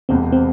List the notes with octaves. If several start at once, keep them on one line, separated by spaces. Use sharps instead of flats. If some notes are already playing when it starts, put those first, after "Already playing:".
E1 E2 C3 C4
C4